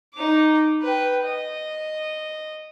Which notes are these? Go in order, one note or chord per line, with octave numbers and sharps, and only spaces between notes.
D#4 D6
B4 G5
D#5